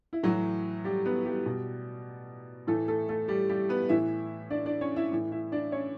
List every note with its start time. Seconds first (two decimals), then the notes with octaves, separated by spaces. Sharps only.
0.13 E4
0.23 A2 E3 F#3 F#4
0.84 G3 G4
1.05 B3 B4
1.25 G3 G4
1.46 B2
2.67 A2 E3 A3 A4
2.88 A3 A4
3.09 A3 A4
3.28 G3 G4
3.50 G3 G4
3.69 B3 B4
3.89 A2 E3 E4 E5
4.50 D4 D5
4.66 D4 D5
4.81 C#4 C#5
4.96 E4 E5
5.12 A2 E3
5.32 E4 E5
5.52 D4 D5
5.72 C#4 C#5